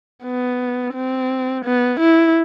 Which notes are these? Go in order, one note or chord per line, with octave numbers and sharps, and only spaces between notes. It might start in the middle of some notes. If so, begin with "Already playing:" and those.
B3
C4
B3
E4